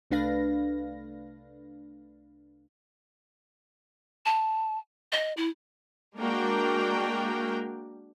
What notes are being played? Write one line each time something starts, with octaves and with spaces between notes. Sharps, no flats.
C2 A3 D4 B4 F5 A#6
A5
D#5
E4
G#3 A#3 D4 F#4 A#4 G5